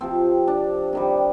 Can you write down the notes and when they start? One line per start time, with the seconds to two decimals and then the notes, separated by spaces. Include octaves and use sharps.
0.01 C3 F3 C4
0.47 D4
0.93 C3 D#3 G3